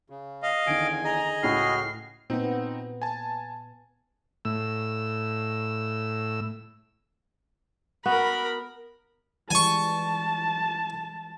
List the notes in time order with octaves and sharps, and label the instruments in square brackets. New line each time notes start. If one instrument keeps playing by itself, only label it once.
[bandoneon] C#3
[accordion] D#5 F5
[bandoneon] E2 G#5 [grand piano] D3 D#3 [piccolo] D7
[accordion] G#4 D#5 [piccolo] A#5
[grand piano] C#2 A2 E4 [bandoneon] F#4 F6 [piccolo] C7
[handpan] A#2 B3 [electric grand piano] C4 D#4
[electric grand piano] G#5 A5
[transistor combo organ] A2 E6
[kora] B3 F#4 [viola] A#4 B5
[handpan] E3 G3 G#3 [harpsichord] G#5 C#6 [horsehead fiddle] A5